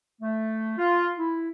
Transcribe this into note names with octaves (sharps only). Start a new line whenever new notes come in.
A3
F4
E4